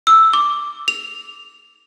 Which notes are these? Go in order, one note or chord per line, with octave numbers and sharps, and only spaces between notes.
E6
D6
F7